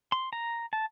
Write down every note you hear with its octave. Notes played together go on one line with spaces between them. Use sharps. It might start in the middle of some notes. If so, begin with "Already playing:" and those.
C6
A#5
A5